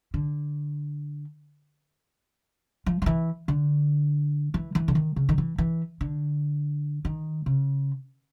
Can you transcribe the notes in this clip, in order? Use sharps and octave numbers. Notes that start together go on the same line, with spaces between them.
D3
F3
F3
E3
D3
E3
E3
D3
D#3
C#3
D#3
E3
E3
D3
D#3
C#3